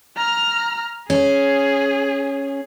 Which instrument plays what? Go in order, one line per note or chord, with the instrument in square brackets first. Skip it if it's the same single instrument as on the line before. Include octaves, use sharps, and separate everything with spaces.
[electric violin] A#5 F6
[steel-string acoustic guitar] C#4 [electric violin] G#4